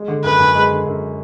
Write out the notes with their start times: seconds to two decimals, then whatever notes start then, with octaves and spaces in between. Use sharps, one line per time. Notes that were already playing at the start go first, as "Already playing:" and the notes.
Already playing: G#3
0.08 D3
0.24 F#2 B4
0.40 F#2
0.55 G#3
0.71 D3
0.86 F#2